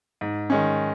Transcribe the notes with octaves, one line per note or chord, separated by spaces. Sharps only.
G#2
D#3 G#3 C#4